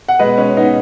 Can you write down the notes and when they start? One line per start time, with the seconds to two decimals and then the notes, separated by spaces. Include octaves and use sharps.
0.09 F#5
0.19 B2 G#3 B4 D#5
0.38 C#4
0.57 B3 D#4